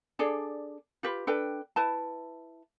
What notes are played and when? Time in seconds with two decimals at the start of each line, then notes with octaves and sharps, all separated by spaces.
0.19 D4 G#4 A4 D5
1.03 F4 G4 B4
1.27 D4 A4 B4 G5
1.76 E4 B4 A5